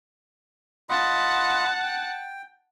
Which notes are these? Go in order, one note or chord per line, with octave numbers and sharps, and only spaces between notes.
F4 D#5 F#5 A5 B5
G5